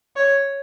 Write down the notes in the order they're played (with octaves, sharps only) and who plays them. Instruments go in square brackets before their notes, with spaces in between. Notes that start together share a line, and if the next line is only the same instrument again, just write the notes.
[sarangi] C#5